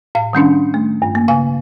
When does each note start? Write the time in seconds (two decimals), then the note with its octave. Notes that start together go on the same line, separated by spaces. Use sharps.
0.15 A2 F5
0.33 D#3 G3 C#4 D4
0.74 A3
1.02 G2
1.15 A#3
1.28 C#3 F5 G#5